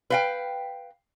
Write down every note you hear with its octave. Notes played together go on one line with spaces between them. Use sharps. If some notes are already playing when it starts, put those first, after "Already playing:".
B4 F5 G5